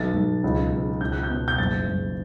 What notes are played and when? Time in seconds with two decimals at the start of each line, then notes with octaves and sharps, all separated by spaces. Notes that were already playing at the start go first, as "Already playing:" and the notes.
Already playing: B1 A6
0.14 B1
0.44 C#2
0.72 C#2
1.01 C#2 G6
1.12 F#6
1.23 G6
1.29 B2
1.48 G6
1.58 F#1 A6
1.88 F#1